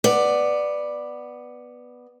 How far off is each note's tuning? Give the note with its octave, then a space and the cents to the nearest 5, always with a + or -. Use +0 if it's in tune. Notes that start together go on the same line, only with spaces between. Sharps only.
B3 +0 D5 +10